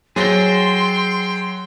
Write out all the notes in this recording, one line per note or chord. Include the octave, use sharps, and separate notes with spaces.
F#3 G#4 C5 G5 C6 A6 A#6